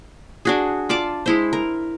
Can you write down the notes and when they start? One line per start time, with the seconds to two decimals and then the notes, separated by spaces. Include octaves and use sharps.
0.45 D4 F#4 G#4
0.89 F4 D5 A5 D6
1.26 G#3 E4 C5
1.53 A#4